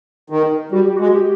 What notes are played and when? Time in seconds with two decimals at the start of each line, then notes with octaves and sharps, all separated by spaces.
0.30 D#3
0.72 G3 F#4
0.84 G4
0.96 G#3 F#4
1.14 G4